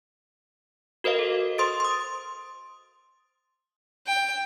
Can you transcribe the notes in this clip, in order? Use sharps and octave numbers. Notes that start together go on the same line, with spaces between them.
F#4 A#4 C5 D#5 F5
A4
C5 C6 D#6 A6 D7
C6 D#6
G5